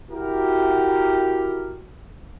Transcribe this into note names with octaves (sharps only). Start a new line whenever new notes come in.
E4 F#4 G4 A#4